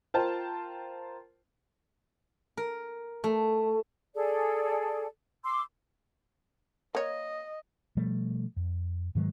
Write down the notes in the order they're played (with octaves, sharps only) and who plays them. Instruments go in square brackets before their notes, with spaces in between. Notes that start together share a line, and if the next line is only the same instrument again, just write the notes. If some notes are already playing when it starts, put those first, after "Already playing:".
[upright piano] F4 A#4 C5 G5 A5
[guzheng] A#4
A3
[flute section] G#4 A4 D5
C6 D6 E6
[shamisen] A#3 C#5 [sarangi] D#5
[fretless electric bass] B2 F3 G3 A3
F2
G#2 D#3 F#3 G#3